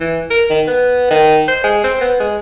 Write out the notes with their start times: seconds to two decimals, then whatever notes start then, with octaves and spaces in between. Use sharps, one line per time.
0.01 E3
0.30 A#4
0.50 D#3
0.68 B3
1.11 D#3
1.48 C5
1.64 G#3
1.84 C4
2.01 B3
2.20 G#3